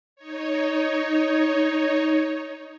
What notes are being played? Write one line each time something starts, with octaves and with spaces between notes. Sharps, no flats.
D#4 C#5